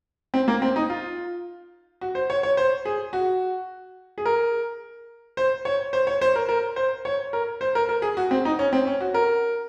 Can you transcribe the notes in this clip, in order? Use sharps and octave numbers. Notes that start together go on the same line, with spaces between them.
C4
A#3
C4
D#4
F4
F#4
C5
C#5
C#5
C5
G#4
F#4
G#4
A#4
C5
C#5
C5
C#5
C5
A#4
A#4
C5
C#5
A#4
C5
A#4
A#4
G#4
F#4
C4
D#4
C#4
C4
C#4
F#4
A#4